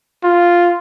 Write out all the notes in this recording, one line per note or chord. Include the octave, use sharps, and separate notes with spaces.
F4